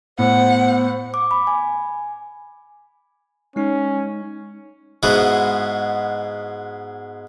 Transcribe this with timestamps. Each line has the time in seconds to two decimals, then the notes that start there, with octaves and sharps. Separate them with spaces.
0.19 A2 B3 C5 F#5
1.14 D6
1.31 B5
1.47 G#5
3.56 G#3 C#4 D#4
5.03 G#2 G#3 B3 E4 F#4